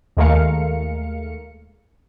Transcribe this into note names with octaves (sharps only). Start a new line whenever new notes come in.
D#2 G#3 A3 A#4 F5 C#7